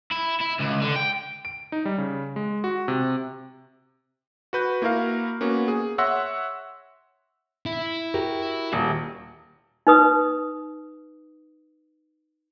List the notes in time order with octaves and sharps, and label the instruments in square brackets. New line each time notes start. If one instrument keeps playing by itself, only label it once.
[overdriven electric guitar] E4
E4
C#2
D3
G5
[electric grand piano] D7
D#4
G3
C#3
G#3
F#4
C3
F#4 B4 G6
A#3 E4 F#4 A#4 F5
A#3 B3 C#4 F#4
G#4
C#5 E5 F#5 C6 E6 A#6
[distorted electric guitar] E4
[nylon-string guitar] F#4 G4 A#4
[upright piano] D#1
[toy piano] D#4 B4 D#6